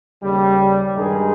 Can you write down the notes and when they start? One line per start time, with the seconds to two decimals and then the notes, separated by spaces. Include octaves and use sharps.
0.21 D#2 C#3 G3
0.94 G2 D#3 G#3 D#4 G#4